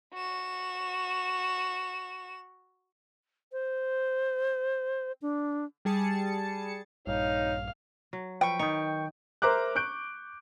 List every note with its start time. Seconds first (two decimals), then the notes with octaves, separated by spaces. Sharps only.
0.14 F#4 E7
3.52 C5
5.22 D4
5.85 G3 G#4 A5 C#7
7.07 A#1 G2 D#4 C#5 F5
8.13 F#3
8.41 F3 B4 G5 C#6
8.60 D#3 D#4 C#6
9.42 A#4 C5 E5 A#5 D6 F#6
9.75 C#6 F#6 G6 D7